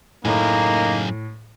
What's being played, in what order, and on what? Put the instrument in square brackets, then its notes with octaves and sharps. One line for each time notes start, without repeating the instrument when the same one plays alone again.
[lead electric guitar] F#2 G#4 [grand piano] A2 [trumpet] A#3 [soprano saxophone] D#4